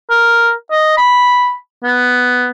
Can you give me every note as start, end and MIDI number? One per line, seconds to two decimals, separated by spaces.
0.10 0.51 70
0.71 0.93 75
0.97 1.53 83
1.84 2.49 59